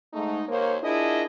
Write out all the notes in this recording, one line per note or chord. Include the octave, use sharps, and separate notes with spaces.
G#2 A3 D#4
D#2 A#3 A#4 C5 C#5
D4 E4 F4 G#4 A#4 D#5